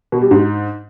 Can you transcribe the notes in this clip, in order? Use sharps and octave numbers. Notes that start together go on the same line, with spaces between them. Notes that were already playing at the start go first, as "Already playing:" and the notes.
B2
G3
G#2